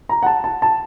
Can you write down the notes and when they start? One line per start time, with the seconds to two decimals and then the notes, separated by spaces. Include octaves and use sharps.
0.09 A#5
0.22 F#5
0.26 A5
0.44 A5
0.62 A5